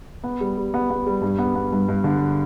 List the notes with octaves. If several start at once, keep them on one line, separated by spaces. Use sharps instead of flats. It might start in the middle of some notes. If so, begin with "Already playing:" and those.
B3
G3
G3
B3
B3
G3
G2
B3
B3
G2
G2
D3